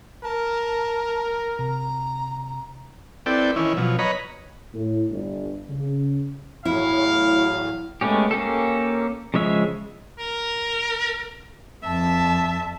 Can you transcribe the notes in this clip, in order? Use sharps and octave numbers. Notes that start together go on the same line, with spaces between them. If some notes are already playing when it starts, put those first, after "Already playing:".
A#4 A5
C3 A#5
C4 E4 A4 B4 D5 G5
D#3 E3 C#4 E4
B2 F3 F#3
B4 C#5 D#5 A#5 B5
A2
G1
C#3
E2 A2 F#3 E4 F5
G#3 A3 B3 C#4 G4
A#3 C#4 G4 A4
C#3 F3 G#3 C#5 E5
A#4
F2 E5 A5